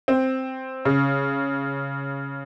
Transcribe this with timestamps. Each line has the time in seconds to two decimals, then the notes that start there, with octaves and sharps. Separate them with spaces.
0.08 C4
0.85 C#3